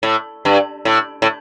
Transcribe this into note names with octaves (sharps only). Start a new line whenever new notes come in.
A2
G2
A2
A2